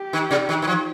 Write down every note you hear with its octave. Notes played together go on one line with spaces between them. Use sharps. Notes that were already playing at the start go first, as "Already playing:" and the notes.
Already playing: G4
D#3
C3
D#3
D#3
F3